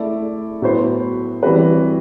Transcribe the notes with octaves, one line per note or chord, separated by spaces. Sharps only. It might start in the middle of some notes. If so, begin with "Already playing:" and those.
Already playing: A3 E4 A4 D5
A2 F#3 B3 F#4 C5
E3 G3 C4 F#4 B4